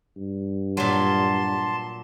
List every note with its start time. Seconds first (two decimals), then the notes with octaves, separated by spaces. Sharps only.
0.17 G2
0.77 A#2 F#3 A5 C6